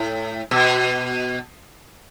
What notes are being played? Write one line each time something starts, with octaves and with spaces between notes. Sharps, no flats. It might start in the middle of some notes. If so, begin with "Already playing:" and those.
Already playing: A2
B2